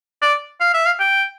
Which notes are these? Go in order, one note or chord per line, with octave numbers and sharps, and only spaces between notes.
D5
F5
E5
F5
G5